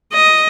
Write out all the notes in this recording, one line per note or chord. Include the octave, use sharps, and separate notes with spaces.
D#5